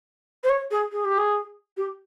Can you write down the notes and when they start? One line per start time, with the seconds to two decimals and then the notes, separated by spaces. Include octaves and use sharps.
0.44 C5
0.49 C#5
0.71 G#4
0.92 G#4
1.05 G4
1.18 G#4
1.77 G4